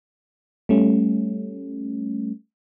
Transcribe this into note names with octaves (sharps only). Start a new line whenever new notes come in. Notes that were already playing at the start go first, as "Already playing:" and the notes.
G3 A3 C#4